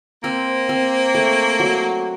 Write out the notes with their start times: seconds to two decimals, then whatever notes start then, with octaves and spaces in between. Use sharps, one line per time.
0.24 A#3 C4
0.69 C4
1.15 A3
1.60 F#3